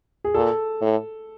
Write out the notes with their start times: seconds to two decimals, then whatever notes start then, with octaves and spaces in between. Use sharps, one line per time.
0.24 G#4
0.34 A#2 A4
0.82 A2